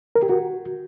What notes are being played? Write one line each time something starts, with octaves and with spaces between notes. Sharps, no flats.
A#4
G4
F#4